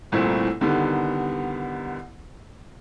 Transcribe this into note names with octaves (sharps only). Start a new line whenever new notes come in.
G1 C2 A#2 A3 C4 E4
C2 D3 D#3 G3 B3